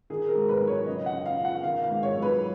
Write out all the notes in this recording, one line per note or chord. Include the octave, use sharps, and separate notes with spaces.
D#3 G#4
A#4
G#2
B4
F#3
C#5
C#3 D#5
F#5
F#2
F5
F3
F#5
D#3 F5
F5
G#2
C#5
F#3
B4